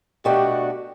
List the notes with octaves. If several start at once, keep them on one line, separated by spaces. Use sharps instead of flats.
B2 A3 D4 F#4 G4